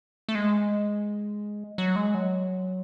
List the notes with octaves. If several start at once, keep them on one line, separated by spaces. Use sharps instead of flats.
A3
G#3
F#3
G#3
F#3